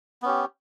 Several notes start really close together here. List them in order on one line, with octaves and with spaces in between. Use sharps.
B3 C#4 G4